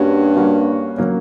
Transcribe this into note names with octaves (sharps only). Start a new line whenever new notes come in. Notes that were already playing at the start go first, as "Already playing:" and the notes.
Already playing: G2 G3 A#3 C#4 F#4
G3 A#3 C#4 F#4
F#3 A#3 C#4